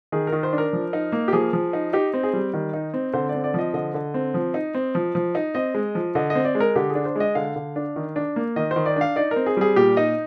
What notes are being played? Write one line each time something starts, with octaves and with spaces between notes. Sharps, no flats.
D#3 G#4
A#4
D#3
C5
D4
A#4
F3
D#4
A#3
G4
F3 G#4
F3
D#4
D#4 G4
C4
G#4
G3
D#3
D#4
C4
D3 C5
D5
C4
D5
F3 D#5
D3 D#5
D3
C4
F3
D#4
C4
F3
F3
D#4
C4 D#5
G#3
F3
D3 D#5
D#5
C4
D5
G#3
A#4
D3 G4
G#4
D4
C5
G#3 D#5
D3 F5
D3
D4
D#3
D4
A#3
D#3 D#5
C5
D#3
D5
D4 F5
D#4 D5
A#4
C4
G#4
G3 G#4
A#2 G4
D#4 D#5